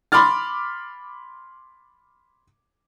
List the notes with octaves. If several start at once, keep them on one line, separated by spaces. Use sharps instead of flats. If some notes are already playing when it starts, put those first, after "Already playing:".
B5 C6 D6 F6 A6